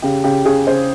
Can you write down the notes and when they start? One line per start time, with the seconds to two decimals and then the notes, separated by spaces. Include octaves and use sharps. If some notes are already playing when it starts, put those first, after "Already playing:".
0.02 C#3 G4
0.24 C#3 G4
0.45 C#3 G#4
0.67 C#3 C5